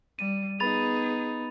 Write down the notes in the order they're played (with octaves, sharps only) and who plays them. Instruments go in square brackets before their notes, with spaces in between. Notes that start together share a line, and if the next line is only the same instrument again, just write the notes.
[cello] G3 [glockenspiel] D#7
[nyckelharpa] B3 D#4 [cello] G#4 [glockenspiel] B5 A6 F7